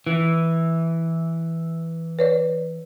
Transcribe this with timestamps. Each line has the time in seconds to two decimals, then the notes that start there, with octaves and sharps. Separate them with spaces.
0.07 E3
2.19 B4 C#5 D5